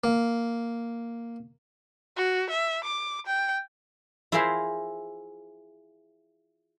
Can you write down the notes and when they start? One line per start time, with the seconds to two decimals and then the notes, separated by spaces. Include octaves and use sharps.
0.04 A#3
2.17 F#4
2.50 E5
2.84 D6
3.27 G5
4.32 E4 F4 G#4 A#4 C5 E5